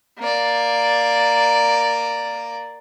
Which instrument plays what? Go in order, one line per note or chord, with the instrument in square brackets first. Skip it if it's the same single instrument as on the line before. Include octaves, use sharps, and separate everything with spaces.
[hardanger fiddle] A#3 D5